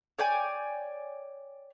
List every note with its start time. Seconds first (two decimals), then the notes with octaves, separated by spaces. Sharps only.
0.19 C#5 D5 G5 G#5